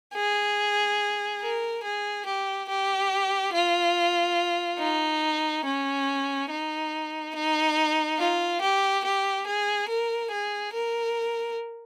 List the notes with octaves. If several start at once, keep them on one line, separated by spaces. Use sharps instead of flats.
G#4
A#4
G#4
G4
G4
F4
D#4
C#4
D#4
D#4
F4
G4
G4
G#4
A#4
G#4
A#4